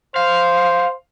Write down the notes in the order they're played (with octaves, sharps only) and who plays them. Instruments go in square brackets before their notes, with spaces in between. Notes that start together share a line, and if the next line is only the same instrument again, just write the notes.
[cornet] C5 [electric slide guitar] F5